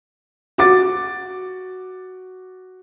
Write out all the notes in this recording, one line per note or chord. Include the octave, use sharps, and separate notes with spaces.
F#4 D6 A6